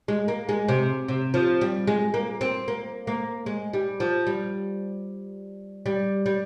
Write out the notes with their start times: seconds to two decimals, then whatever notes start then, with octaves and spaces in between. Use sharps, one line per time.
0.08 G#3
0.28 A#3
0.49 G#3
0.68 C3
1.08 C3
1.34 F3
1.61 G3
1.87 G#3
2.14 A#3
2.41 C4
2.68 A#3
3.07 A#3
3.46 G#3
3.73 G3
4.00 F3
4.27 G3
5.86 G3
6.26 G3